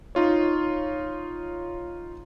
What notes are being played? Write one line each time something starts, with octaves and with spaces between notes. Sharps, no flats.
D#4 F4 C#5